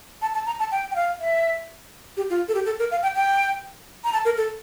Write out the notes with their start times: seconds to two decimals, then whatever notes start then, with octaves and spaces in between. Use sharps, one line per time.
0.22 A5
0.34 A5
0.46 A#5
0.59 A5
0.72 G5
0.91 G5
0.96 F5
1.20 E5
2.17 G4
2.30 F4
2.48 A4
2.55 G4
2.66 A4
2.79 A#4
2.91 F5
3.02 G5
3.16 G5
4.04 A#5
4.13 A5
4.25 A#4
4.37 A4